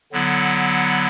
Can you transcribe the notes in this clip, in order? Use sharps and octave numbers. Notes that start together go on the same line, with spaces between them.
D3 F#3 B3 E4